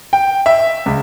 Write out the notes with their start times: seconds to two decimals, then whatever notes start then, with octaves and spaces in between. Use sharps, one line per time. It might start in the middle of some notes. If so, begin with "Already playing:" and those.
0.13 G5
0.46 E5
0.86 C#2